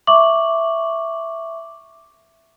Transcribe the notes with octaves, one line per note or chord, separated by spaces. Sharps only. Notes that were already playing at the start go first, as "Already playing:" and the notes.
E5 C#6 D6 F#7